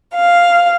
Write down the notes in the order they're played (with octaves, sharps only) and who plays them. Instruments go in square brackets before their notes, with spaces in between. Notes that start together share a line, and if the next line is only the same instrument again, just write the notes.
[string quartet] F5